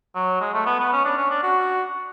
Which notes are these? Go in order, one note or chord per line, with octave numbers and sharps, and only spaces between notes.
F#3
G#3
A3
B3
B3
C#4
D4
C#4
D4
F#4